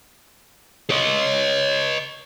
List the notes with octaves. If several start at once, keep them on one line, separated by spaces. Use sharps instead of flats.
C#5 D#5